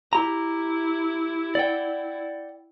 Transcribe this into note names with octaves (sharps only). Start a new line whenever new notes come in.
E4 G4 A#5
D5 F#5 G5